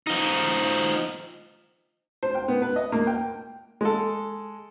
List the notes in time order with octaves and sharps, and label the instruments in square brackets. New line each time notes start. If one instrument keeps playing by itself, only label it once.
[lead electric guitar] F3 D#4
[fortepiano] C5
G5
B3
B4
D#5
A#3
G5
G#3 A4